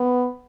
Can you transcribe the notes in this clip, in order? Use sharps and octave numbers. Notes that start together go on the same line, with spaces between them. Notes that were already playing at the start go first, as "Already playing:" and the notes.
Already playing: B3